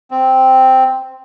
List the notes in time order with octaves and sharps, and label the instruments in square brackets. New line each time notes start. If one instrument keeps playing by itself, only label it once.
[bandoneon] C4